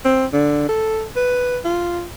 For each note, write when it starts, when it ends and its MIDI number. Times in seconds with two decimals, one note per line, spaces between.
0.05 0.26 60
0.33 0.69 50
0.69 1.04 69
1.16 1.59 71
1.65 2.05 65